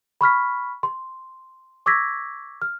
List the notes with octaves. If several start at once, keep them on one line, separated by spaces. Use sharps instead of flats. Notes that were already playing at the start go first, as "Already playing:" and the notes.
B5 C#6 F6 B6
C6
C#6 D6 E6 G#6 A#6 B6
F6